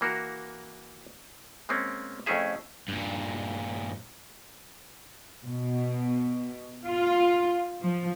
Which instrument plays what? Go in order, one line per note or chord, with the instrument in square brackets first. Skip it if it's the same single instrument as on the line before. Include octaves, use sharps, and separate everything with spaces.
[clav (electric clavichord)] E3 A#3 F#4 A#4
G#3 A#3 C4 C#4
F2 A3 C#4 E4 G#4 E5
[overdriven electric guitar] G2 A#2
[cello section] B2
F4
F3